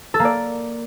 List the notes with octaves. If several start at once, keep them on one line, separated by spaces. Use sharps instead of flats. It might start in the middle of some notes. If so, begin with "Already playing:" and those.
A4
A#3
D5